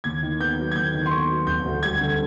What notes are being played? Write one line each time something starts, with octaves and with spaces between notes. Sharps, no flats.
D#2 G#6
D#3
B3 G6
F#3
G#6
D#2 G6
D#3
C6
B3 C#6
F#3
E1 G6
D2
G3 G#6
D3